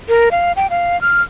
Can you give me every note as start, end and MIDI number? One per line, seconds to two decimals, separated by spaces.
0.09 0.29 70
0.31 0.52 77
0.56 0.67 79
0.70 0.99 77
1.01 1.22 89